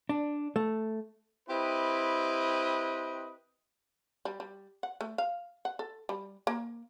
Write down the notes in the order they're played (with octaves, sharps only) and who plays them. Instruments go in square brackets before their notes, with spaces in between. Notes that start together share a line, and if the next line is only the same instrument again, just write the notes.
[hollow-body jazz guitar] D4
A3
[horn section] C4 E4 G4 B4 D#5
[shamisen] G3
G3
F#5
A3
F5
F#5
A4
G3
A#3